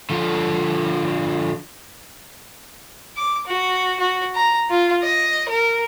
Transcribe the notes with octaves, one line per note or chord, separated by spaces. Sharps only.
D3 F3
D6
F#4
F#4
A#5
F4
D#5
A#4